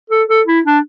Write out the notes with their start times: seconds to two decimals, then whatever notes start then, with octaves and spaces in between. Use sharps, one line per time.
0.10 A4
0.29 A4
0.47 E4
0.66 D4